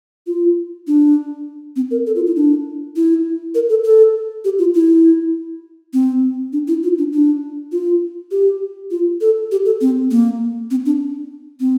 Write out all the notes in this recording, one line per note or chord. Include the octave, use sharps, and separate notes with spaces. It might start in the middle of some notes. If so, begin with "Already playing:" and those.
F4
D4
C4
A#4
A4
F4
E4
D4
E4
A#4
A4
A4
G4
F4
E4
C4
D4
E4
F4
D4
D4
F4
G4
F4
A4
G4
A4
C4
A#3
C4
D4
C4